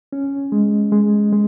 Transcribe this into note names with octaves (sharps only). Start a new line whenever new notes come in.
C#4
G#3
G#3
G#3